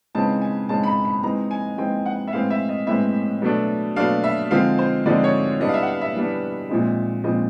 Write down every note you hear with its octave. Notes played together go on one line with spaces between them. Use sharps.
C#3 E3 G#3 C4 D#4 A5
G#5
C#3 E3 G#3 C4 D#4 A5
B5
A#5
B5
E3 G#3 C4 D#4 A#5
G#5
E3 G#3 C4 D#4 G5
F#5
E5
A2 E3 G#3 C4 F5
E5
D#5
A2 E3 G#3 C4 E5
B2 F#3 A3 D4
B2 F#3 A3 D4 F5
E5
D3 F3 G#3 C4 D#4 F5
C5
D3 F3 G#3 C4 D#4 D5
C#5
E3 G3 B3 D4 D#5
F5
E5
F#5
F5
E5
E3 G3 B3 D4
A#2 F3 G#3 C4 D#4
A#2 F3 G#3 C4 D#4 D#5